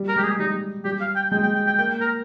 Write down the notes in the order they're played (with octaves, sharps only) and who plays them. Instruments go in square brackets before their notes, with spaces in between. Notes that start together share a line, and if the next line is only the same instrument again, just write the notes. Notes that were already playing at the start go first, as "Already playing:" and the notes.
Already playing: [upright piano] G3
[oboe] A#4
[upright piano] G#3 [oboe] G4
[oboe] G#4
[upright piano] G3 [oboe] D#4
[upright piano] G3 [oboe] G4
[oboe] F5
G5
[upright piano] G#3 [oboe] G5
[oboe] G5
G5
G5
[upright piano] A#3 [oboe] G5
[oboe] G5
A#4